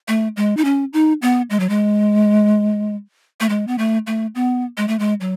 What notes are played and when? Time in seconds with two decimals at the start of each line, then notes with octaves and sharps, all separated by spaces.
0.08 A3
0.37 G#3
0.57 D#4
0.65 C#4
0.93 D#4
1.22 B3
1.50 G#3
1.60 F#3
1.69 G#3
3.40 A3
3.49 G#3
3.67 B3
3.78 A3
4.07 A3
4.35 B3
4.77 G#3
4.88 A3
4.99 G#3
5.20 F#3